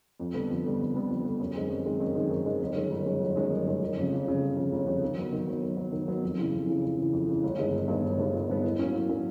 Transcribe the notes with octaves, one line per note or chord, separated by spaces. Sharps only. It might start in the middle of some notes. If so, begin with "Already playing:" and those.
F2
D3 G3 B3
F2
D3 G3 B3
F2
D3 G3 B3
F2
D3 G3 B3
F#2
D#3 G#3 C4
F#2
D#3 G#3 C4
F#2
D#3 G#3 C4
F#2
D#3 G#3 C4
G1
F#2 D#3 G#3
G1
F#2 D#3 G#3
G1
F#2 D#3 G#3
G1
F#2 D#3 G#3
G1
F2 C#3
G1
F2 C#3
G1
F2 C#3
G1
F2 C#3
D#3
F#3 B3
D#3
F#3 B3
D#3
F#3 B3
D#3
F#3 B3
F2
C#3 E3
F2
C#3 E3
F2
C#3 E3
F2
C#3 E3
G1
G2 D#3 G#3 B3
G1
G2 D#3 G#3 B3
G1
G2 D#3 G#3 B3
G1
G2 D#3 G#3 B3
A2
F#3 A#3 C#4
A2
F#3 A#3 C#4